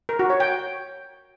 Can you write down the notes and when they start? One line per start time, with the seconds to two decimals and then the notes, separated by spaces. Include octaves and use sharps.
0.09 A#4
0.19 F#4
0.30 C#5
0.40 G5